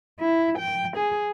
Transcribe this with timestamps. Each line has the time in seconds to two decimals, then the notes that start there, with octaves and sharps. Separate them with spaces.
0.20 E4
0.59 G5
0.97 G#4